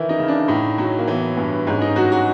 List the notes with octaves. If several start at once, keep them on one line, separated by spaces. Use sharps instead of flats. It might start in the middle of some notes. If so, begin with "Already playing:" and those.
Already playing: D#3 E3 E4
D#4
C#3
D4
A2 D#4
F#3
A#3
E3 B3
G2
G#2 C#4
D#4
F#3 F#4
F#4